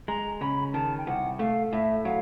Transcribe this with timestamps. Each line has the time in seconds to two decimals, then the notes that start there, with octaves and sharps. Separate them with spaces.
0.08 G#3 A#5
0.41 C#3 B5
0.73 D#3 A5
0.98 G5
1.07 C2 F#5
1.39 A3 F5
1.72 A2 E5
2.05 F#3 F5